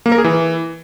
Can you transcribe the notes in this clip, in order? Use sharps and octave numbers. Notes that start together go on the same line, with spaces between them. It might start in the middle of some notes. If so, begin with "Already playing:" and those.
A#3
A#4
G#4
E3